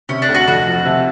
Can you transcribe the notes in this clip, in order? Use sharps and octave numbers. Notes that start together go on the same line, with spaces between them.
C3 C#4
D4
D2
F#4
F2 F#4
F3
C3